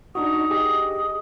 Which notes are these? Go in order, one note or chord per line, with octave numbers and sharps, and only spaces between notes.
D4 D#4 F#4 D#6
G4 G#4 D#5